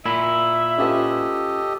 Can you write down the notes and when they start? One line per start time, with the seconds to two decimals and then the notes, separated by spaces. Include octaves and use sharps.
0.05 A#2 E4 E5
0.78 C#4 F4 G4 A4 B4 D#5